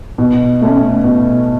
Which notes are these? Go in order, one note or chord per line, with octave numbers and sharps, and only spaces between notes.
B2
A3 C#4
B2